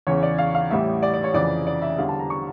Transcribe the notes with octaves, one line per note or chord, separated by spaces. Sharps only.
E2 C#3 E3 C#5
D5
F5
F5
A1 A2 E3 G3 E5
D5
D5
C#5
F1 F2 C#3 E3 D5
D5
E5
E2 D3 G3 F5
A5
A#5
C#6